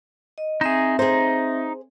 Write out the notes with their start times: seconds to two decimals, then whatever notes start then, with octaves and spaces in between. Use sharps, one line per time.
0.38 D#5
0.61 C4 D#4 G#4 E5
0.99 D#4 G#4 C5